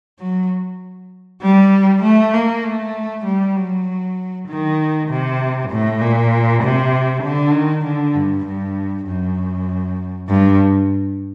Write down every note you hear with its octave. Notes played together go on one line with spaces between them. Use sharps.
F#3
G3
A3
A#3
A3
G3
F#3
D#3
C3
A2
A#2
C3
D3
D#3
D3
G2
G2
F#2
G2